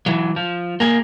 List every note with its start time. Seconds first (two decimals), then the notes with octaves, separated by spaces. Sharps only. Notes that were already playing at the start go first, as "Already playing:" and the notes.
0.06 E3 F#3
0.36 F3
0.80 A#3 G#4